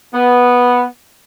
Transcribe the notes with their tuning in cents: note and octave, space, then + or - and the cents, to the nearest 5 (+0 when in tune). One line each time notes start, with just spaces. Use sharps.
B3 -5